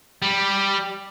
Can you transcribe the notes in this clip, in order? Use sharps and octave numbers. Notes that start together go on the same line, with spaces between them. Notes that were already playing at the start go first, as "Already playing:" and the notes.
G3